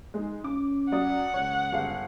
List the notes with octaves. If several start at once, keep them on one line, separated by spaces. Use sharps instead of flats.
G#3 D#4
C#4 D6
F#3 D5 F#5 D#6
C#2 C#5
G1 G#4 F5